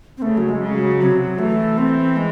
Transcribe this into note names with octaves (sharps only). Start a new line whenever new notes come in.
C4
C#3 A3
F#3
G#3
C#3
F#3
C3 F#3
E3 A3
C4
G#3